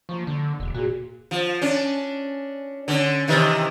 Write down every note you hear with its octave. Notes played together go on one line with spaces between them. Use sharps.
F3 A#3 C#6
D3
E1
A#2 F#4 G#4
F3
C#4 D4
D3 C#4
C3 D#3 E3